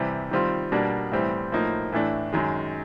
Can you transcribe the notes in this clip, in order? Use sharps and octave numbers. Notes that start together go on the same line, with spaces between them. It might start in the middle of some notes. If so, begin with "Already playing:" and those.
Already playing: C3 E3 G3
D#3 G3 C4 F4
B2 G3 A#3 D4
A2 E3 G3 C4
A2 F3 A#3 D#4
A2 E3 A3 D4
F#2 D#3 G#3